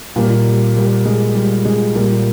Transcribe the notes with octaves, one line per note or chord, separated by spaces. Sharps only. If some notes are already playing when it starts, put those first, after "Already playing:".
A#2 G3 A#3
G3
G3 A#3
G#3
G3
G#3
A#2 G3 A#3